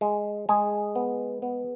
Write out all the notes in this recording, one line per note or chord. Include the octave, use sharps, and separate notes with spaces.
G#3
G#3 G#4
B3
B3